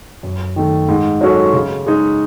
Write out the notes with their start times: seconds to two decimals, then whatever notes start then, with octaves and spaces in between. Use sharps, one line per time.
0.23 F#2
0.56 D#3 A3
0.89 G#2
1.21 F#3 C#4 F#4 A4
1.53 C#3
1.86 G#3 D#4